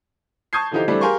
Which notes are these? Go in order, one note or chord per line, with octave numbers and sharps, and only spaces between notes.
A5 C#6 D#6 G6 G#6 C7
D3 E3 F3 D#4 F4 G4
E3 G3 A3 C4 D4
G4 G#4 A#4 F5 C6 C#6